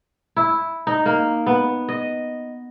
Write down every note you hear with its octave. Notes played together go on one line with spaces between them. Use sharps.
E4
D#4
A#3
B3
D#5